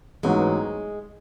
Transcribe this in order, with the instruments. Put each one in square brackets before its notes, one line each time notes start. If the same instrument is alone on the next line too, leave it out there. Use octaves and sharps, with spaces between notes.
[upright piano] A1 G#2 F#3 B3 [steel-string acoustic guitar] G#3